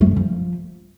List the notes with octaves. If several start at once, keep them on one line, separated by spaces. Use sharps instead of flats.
A3
G2
D3
F3